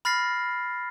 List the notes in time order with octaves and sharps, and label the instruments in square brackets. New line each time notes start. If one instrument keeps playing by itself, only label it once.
[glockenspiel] B5 F6 A6 A#6 C7